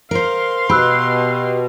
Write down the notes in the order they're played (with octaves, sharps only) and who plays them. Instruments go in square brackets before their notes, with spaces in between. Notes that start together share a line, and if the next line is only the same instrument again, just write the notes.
[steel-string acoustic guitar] A#4 C5 [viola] F5 C6
[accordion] B2 [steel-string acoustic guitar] G4 [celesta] B5 E6 F#6